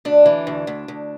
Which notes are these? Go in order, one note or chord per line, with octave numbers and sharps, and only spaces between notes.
D2 D4
E3
D2
D2
D2